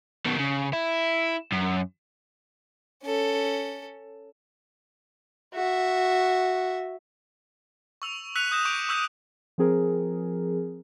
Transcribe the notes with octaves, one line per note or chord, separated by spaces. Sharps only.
B2 D#3
C#3
E4
F#2
C#4 A4
F#4 E5
C#6 E6 F7
E6 F#6 B6 C#7 D#7 F7
D#6 G6 A#6 E7
C#6 D6 G6 D7 F7
C#6 E6 G6 B6
F3 C4 G#4 A#4